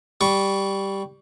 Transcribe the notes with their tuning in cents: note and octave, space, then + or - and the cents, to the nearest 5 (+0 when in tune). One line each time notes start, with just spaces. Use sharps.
G3 +0 C#6 +20